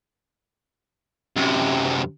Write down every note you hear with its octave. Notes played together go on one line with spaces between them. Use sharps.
F#2 C3